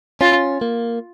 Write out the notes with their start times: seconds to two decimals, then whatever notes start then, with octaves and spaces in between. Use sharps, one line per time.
0.21 C#4 F4
0.61 A#3